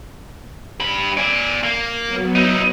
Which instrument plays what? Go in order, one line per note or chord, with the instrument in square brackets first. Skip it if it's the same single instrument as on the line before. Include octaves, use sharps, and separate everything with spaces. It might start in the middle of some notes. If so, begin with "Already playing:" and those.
[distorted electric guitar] G2 B5
D5 G#5
A#3
[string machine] F#3 B3
[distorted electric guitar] D#4 E4